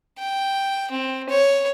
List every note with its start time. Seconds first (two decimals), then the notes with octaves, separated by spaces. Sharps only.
0.19 G5
0.91 C4
1.29 C#5